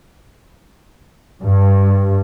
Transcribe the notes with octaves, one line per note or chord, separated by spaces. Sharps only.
G2